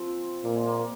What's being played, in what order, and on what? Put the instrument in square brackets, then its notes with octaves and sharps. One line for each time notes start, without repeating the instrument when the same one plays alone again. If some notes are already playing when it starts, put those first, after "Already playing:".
Already playing: [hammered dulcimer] F3 C4
[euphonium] A#2 [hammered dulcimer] A#3
[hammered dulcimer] G#3
A#3